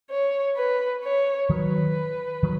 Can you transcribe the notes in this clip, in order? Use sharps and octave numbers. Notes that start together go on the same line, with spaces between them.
C#5
B4
C#5
D#3 F#3 B4
D#3 F#3